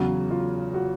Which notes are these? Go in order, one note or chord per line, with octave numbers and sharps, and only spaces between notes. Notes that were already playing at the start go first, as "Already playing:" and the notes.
Already playing: E2 C#3 F#3 F#4
F4
F#4